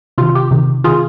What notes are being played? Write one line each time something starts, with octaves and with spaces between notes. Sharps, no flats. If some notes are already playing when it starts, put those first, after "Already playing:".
C3 D#3 F4
G4
C3 D#3
C3 D#3 F4 G#4